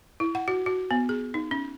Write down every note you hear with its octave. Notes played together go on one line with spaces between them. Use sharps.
E4
F#5
F#4
F#4
B3
G#4
D#4
C#4